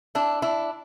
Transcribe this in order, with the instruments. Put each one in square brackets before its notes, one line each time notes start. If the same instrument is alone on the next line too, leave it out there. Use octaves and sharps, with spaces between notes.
[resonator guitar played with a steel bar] D4 E4
D4 E4